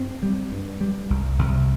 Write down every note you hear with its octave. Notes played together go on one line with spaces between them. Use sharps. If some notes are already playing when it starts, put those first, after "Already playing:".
Already playing: G2 C4
G3
G2
G3
C2
C2